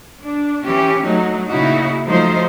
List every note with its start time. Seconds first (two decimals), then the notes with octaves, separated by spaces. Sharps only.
0.22 D4
0.63 E3 C#4 G4
1.04 F#3 A3 D#4
1.49 A#2 C#3 D#4 E4 F#4
2.06 F3 F#3 A3 D#4 C5